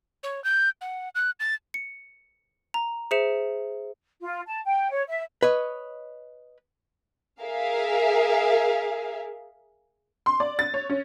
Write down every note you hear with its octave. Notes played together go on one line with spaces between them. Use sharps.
C#5
G6
F#5
F#6
A6
C#7
A#5
G#4 C5 E5 C#7 E7
F4
A5
G5
C#5
E5
B4 C#5 D#5
G#4 A#4 E5 F5
C6
D5
A6
C#5
C#4